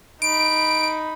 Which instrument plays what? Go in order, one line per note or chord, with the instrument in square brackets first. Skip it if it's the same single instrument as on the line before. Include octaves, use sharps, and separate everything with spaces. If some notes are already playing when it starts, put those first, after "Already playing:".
[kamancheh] D#4 B5 [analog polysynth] D7